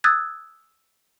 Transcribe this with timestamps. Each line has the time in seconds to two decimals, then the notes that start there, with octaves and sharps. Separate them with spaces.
0.04 D#6 E6 F#6 G#6 A6